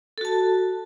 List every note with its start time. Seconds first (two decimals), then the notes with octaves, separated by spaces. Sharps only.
0.18 A4
0.21 F#4
0.25 A5